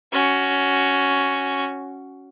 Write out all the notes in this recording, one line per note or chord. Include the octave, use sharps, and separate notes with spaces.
C#4 F#4